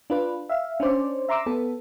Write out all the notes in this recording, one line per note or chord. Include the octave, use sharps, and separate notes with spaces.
D4 F4 B4
E5 F5
C#4 D4 C5 D5
E5 A#5 C6 D6 E6
B3 A4